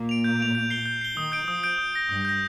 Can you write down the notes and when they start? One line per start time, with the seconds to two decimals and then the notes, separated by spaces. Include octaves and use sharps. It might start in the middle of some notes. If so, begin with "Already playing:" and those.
Already playing: A#2 A#3
0.09 D7 F7
0.24 G6
0.40 D7 F7
0.55 G6
0.70 C7 G7
0.86 G6
1.01 C7 G7
1.17 D#3 D#6
1.32 G6 D7
1.47 F3 D#6
1.64 G6 D7
1.78 D#6
1.94 G6 A#6
2.09 G2 G3 D#6
2.25 G6 A#6